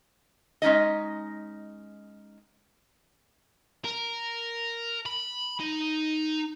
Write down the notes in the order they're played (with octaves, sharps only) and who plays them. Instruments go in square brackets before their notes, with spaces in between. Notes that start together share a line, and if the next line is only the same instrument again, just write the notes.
[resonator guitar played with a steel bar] G#3 C#4 D#4 D#5
[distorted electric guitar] A#4
B5
D#4